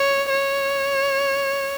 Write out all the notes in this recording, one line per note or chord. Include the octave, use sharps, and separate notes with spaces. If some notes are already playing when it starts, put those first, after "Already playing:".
Already playing: C#5
C#5